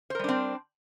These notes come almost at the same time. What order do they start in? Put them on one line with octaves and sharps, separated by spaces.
C5 A#4 G3 D4 C4